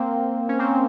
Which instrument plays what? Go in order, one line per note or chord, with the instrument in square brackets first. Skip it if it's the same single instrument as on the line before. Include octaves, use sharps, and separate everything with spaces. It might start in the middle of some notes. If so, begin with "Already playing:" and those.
Already playing: [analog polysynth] A#3 C4
C#4
A#3 C4